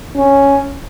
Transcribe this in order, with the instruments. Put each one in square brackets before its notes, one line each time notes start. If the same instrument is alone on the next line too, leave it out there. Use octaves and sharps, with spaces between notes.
[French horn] C#4